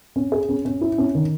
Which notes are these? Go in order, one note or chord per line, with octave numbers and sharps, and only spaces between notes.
C#4
G#4
C#4
C#4
E4
C#4
D#3